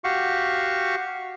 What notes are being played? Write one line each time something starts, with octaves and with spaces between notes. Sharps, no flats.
F#4 G4 F5 C#6